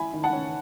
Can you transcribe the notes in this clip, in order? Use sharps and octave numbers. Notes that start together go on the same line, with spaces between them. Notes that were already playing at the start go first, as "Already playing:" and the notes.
Already playing: E4 G#5 B5
D#3
F#5 A5
C#4